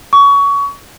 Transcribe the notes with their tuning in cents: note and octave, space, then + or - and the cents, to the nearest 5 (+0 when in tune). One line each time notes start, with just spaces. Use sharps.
C#6 +25